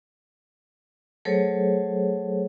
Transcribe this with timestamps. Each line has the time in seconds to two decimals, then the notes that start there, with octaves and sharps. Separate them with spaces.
1.25 F#3 A3 G#4 A4 C5 C#5